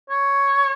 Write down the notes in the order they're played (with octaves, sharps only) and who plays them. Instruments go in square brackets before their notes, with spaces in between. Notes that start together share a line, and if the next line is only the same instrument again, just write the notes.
[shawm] C#5